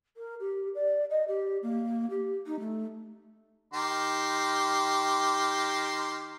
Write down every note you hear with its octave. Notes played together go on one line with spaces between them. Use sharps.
A#4
G4
D5
D#5
G4
A#3
G4
D#4
A3
D#3 G4 C6